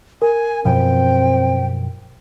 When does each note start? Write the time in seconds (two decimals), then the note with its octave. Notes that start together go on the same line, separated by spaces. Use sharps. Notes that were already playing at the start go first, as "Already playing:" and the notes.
0.22 A#4 G#5
0.65 F#2 B2 F3 C4 G5